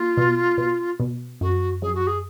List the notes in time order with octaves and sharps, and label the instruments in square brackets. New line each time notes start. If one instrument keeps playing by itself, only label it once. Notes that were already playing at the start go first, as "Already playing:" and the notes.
Already playing: [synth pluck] A#3 [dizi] F4
[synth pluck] B2
B2
B2
[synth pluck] F#2 [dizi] F#4
[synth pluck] F#2 [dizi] G#4
[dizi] F#4
G#4